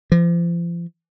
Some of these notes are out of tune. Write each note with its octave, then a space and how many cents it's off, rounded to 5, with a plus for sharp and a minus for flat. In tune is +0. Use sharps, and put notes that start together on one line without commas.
F3 -35